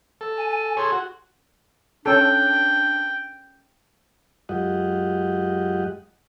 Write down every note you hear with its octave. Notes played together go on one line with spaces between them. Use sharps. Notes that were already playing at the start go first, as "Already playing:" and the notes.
A4
G#5
G#5
G#4 A4 C#5 C6
F#4
C#4 D4 A4 G5
F#2 G#3 F4 G4 D#5 F#5